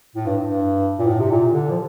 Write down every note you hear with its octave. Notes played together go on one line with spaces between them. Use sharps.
A2
G2
G2
A#2
A2
C3
A#2
D3
F3